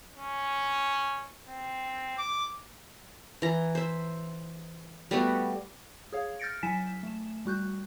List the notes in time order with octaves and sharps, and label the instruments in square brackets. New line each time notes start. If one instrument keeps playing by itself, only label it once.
[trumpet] C#4
C4
D6
[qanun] E3 A#5
C5 E5
G3 A3 B3 F#4
[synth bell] G#4 C#5 F5
F6 G6 A6 A#6 C#7 D7
F#3 E4 G#5 B6 E7
A3 E7
G3 F#4 F#6 G6